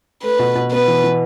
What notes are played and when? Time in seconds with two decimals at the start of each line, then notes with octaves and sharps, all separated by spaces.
0.23 A3 B4
0.39 B2
0.55 B2
0.72 B3 B4
0.87 E3
1.04 E3